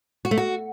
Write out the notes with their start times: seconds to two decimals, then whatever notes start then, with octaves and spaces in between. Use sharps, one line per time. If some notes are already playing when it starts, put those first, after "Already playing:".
0.25 F#4
0.31 A3
0.38 F#4